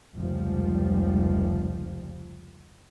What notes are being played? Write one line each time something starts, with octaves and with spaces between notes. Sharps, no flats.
F1 C#2 F3 G3